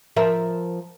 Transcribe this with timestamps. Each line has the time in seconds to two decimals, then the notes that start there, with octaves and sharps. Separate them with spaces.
0.17 F3 A#4 E5